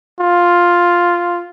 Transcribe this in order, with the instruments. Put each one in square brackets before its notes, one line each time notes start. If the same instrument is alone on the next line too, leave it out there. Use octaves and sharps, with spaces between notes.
[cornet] F4